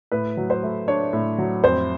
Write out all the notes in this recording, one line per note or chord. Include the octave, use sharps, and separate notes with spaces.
A2 B4
F#3
C5
A3
D4 C#5
A2
F#3
F2 C5